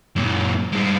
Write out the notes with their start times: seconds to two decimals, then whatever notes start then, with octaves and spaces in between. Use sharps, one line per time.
0.16 F#2 A#2
0.72 G2 G#3